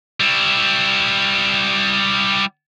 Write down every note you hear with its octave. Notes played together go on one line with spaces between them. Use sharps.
G3 E4